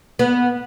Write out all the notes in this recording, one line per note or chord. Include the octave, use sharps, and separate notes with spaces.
B3